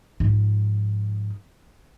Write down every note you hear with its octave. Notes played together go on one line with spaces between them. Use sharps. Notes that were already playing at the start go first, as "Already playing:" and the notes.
G#2 F3